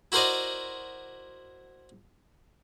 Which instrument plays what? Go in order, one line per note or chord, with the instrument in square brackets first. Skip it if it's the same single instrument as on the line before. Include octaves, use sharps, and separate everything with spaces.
[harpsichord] E4 F#4 A#4 C5 D5 D#5